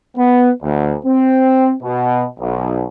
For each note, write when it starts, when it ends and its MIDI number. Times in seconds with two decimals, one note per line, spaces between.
0.17 0.50 59
0.62 0.95 38
1.05 1.73 60
1.83 2.25 47
2.39 2.85 35